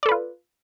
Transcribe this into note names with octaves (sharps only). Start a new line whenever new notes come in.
F4 A4 B4 D5